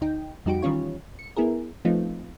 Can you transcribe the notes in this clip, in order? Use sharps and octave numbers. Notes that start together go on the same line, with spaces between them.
D2 D#4 G5
F2 G3 D#4 F#4 G4 D7
D#3 E3 G3 C#4 F4 C#5
C#7
B3 E4 G#4 A#4
F3 A3 B3 C4 D#4 F4